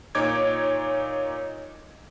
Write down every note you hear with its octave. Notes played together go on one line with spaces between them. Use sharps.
A#2 D#4 C#5 D6 G#6